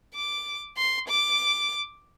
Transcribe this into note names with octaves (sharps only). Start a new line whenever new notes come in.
D6
C6
D6